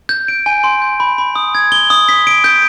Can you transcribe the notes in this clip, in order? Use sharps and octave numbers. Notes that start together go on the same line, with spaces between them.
G6
D7
G#5
C6
G6
B5
B5
D#6
G#6
G7
D#6
B6
D7
G6